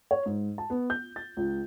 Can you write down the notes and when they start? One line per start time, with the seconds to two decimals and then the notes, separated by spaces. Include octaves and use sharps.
0.11 C#5
0.26 G#2
0.58 A5
0.70 B3
0.90 G6
1.16 A6
1.37 C#2